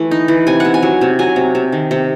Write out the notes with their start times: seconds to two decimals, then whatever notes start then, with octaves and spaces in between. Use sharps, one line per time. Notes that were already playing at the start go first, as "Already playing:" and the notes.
Already playing: E3 A3
0.11 D#4
0.28 E3
0.47 C3 G#5
0.60 C3 F#5
0.74 G#5
0.83 F#3
1.01 C3
1.19 F#3 G#5
1.36 C3
1.55 C3
1.72 D#3
1.91 C3